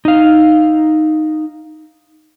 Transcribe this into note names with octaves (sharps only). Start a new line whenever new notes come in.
D#4 F5